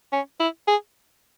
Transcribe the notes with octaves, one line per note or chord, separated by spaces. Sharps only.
C#4
E4
G#4